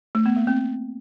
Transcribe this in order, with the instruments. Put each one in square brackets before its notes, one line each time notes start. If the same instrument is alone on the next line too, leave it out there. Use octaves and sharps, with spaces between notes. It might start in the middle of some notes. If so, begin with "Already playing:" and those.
[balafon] A3
B3
A#3
C4